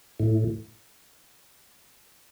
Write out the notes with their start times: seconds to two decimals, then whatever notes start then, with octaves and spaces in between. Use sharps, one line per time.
0.20 A2